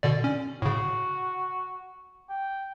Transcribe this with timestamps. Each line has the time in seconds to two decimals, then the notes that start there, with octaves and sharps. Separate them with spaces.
0.03 B2 D3 D5
0.24 C#4
0.62 A2 C#3 F#4
2.29 G5